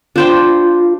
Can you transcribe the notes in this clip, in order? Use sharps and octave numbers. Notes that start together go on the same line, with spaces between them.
D4 F4 C5 G5